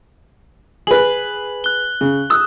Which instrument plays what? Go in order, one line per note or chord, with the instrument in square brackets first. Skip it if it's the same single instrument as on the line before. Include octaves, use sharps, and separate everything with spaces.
[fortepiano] G#4 B4 [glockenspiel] F#7
[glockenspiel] F#6 G7
[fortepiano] C#3
[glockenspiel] D#6 F#6 [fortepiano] E6